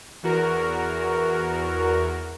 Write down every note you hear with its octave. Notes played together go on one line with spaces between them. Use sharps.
E2 F#4 A#4